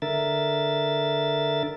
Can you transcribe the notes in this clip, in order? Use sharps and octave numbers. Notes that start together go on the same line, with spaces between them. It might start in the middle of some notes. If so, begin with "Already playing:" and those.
D3 A#4 E5 A6